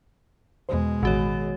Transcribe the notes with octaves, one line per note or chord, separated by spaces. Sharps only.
E2 B2 G#3 C5
A1 D#3 F#4 C#5